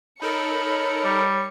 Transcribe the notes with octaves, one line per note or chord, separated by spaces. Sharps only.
D#4 A4 A#4 C#5 B5 C#7
G3